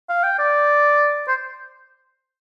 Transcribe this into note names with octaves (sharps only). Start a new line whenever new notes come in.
F5
G5
D5
C5